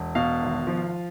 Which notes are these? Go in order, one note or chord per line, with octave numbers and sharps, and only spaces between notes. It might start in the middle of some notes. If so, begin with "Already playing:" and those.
Already playing: E1
B2 F5
G#1
F3